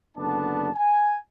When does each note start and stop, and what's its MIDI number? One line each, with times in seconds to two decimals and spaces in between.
0.17 0.70 30
0.17 0.70 50
0.17 0.70 59
0.17 0.70 62
0.17 0.70 81
0.75 1.17 80